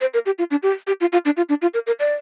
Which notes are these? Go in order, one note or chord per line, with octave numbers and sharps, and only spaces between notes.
C5
A#4
G4
F4
D4
G4
G4
F4
F4
D4
F4
D4
F4
A#4
A#4
D5